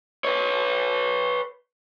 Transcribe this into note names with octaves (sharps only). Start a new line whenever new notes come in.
B4 C#5